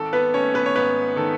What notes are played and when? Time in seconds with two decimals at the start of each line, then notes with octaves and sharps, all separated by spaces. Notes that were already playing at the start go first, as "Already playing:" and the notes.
Already playing: G#1 A4
0.13 B3 B4
0.34 A3 C#4 C#5
0.54 B3 B4
0.66 C#5
0.75 G#2 B3 B4
1.16 D#3 A4